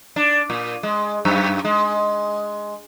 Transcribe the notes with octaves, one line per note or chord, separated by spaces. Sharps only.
D4
A#2
G#3
F#2
G#3